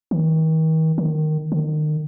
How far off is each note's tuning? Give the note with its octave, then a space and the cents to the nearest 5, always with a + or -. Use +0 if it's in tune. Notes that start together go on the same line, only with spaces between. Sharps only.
D#3 +40
D#3 -10
D#3 -35